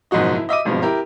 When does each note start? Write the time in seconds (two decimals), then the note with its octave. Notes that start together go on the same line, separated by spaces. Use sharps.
0.11 F#1 B1 G#2 F3 F#4 D#5
0.36 E4
0.49 D#5 E5 D6 D#7
0.65 G#1 G2 B2 F3 G#3
0.82 E4 G4 A#4